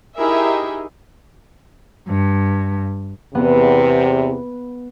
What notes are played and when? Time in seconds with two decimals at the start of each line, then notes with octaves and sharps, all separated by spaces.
0.17 D#4 E4 G4 G#4 A#4 E5
2.09 G2
3.35 E2 C3 B3